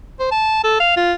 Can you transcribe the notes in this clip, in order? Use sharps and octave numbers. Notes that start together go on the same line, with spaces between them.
C5
A5
A4
F5
F4